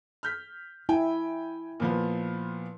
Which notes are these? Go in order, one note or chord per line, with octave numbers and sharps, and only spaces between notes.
F6 G6 B6
E4 G5 G#5
A#2 F3 B3